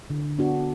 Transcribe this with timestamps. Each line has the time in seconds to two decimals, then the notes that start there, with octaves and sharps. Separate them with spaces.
0.10 D3
0.39 B3 D4 F#4